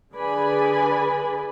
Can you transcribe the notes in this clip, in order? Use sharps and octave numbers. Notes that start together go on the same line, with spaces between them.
D3 G#4 B4 D5 G#5 B5